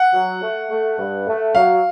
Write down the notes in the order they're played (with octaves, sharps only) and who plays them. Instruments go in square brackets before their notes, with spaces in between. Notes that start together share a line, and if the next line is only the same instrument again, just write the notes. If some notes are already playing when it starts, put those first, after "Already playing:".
Already playing: [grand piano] F#5
[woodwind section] F#3
A3
A3
G2
A3
[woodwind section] F#3 [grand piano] F5